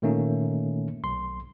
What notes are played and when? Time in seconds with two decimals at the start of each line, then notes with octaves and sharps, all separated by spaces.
0.02 A#2 D#3 A3 A#3 C#4 D#4
1.04 B1 C6